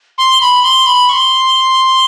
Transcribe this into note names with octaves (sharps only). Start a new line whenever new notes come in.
C6
B5
C6
B5
C#6
C6